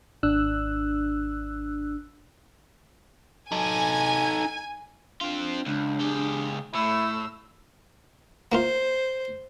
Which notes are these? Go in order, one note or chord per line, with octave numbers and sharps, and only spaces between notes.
G#1 D4 E6 F#6
D#4 A4 G#5
C4 D4 F4
C#2 D4
C#2 G4 G#4
A2 A3 E4 E6
A#3 E4 F4 C5